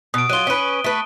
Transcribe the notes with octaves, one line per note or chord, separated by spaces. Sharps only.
B2 D#6 D7
F#3 F4 D#7 G7
C#4 B4
A3 B4